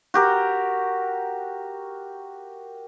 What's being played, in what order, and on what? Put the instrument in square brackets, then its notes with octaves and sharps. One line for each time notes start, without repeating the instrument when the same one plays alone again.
[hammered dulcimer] F#4 G4 A#4